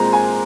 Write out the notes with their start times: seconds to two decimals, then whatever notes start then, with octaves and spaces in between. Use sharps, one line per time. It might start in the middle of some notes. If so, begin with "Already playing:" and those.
Already playing: A#2 G#3 C4 A#5
0.13 G#5